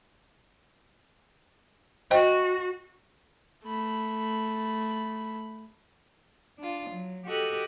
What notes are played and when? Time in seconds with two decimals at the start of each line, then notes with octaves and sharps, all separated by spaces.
2.11 F#4 C5 D#5 G5
3.64 A3 B5
6.59 D4 F4
6.90 F#3
7.25 F#4 G4 A4 D#5 F#6